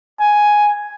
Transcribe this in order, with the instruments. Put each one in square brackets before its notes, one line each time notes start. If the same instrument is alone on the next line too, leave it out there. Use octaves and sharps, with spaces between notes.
[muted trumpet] G#5